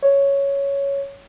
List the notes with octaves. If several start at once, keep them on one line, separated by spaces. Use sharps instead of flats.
C#5